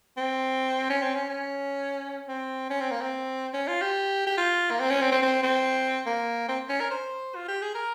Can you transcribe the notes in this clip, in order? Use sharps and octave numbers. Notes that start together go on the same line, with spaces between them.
C4
C#4
C4
C#4
C#4
C4
C#4
C4
A#3
C4
C#4
F4
G4
G4
F4
A#3
C4
C#4
C4
C4
C4
C4
A#3
C4
C#4
A#4
C5
F4
G4
G#4
A#4